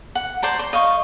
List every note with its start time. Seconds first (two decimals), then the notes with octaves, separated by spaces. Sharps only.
0.15 F#5
0.42 C5 D5 A5 A#5
0.59 C6
0.73 D#5 F5 C#6